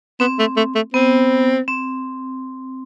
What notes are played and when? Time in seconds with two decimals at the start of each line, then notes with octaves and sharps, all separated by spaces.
0.20 B3 C4
0.39 A3
0.57 A3
0.75 A3
0.94 B3 C4
1.68 C4